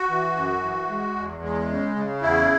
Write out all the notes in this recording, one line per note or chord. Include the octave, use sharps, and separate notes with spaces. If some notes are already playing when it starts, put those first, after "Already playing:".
Already playing: F#4
E3
F#2
E3
G#3
E2
G#3
C#3
C#3
E2 E4